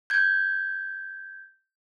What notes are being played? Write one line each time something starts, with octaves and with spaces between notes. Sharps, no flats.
G6 G#6